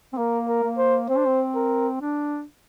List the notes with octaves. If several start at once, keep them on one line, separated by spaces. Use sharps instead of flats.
C4
A#3 A#4
A#4
A#3
C5
C4 C5
D4
C4
A#4
D4